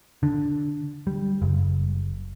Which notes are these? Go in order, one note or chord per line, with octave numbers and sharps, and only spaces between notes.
D3
G3
F#1